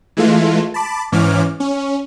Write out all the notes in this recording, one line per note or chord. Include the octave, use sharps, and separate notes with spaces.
E3 G#3 A3 F4
A5 B5 D6
G#2 E3 C#4 D6 F6
C#4